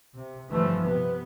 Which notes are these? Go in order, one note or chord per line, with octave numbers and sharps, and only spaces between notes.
C3
G2 D3 E3 F3 A3
C3 B3